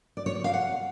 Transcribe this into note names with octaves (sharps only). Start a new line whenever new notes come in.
D5
C#5
D5
F5
F#5